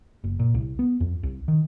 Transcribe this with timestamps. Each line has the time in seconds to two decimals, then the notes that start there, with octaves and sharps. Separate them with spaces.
0.24 F#1
0.39 A#2
0.54 C2
0.79 B3
1.01 F2
1.23 C2
1.48 D#3